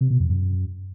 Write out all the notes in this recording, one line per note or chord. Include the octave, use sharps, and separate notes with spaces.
C3
B2
F2
F#2